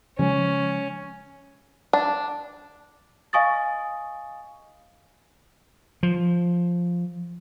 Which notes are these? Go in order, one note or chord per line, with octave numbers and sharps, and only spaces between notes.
C#3 F3 G#3 C#4
D4
D#5 F5 G#5 C#6 D#6 A6
F3